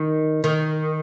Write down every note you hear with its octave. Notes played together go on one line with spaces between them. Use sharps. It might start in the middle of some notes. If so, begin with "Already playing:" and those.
Already playing: D#3
D#3